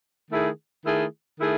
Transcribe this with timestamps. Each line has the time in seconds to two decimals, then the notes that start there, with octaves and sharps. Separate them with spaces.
0.30 D#3 A3 E4 G#4
0.85 D#3 A3 E4 G#4
1.40 D#3 A3 E4 G#4